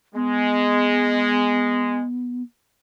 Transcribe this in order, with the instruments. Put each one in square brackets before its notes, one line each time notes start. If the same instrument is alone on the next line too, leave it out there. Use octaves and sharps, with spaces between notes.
[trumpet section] G#3 [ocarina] B3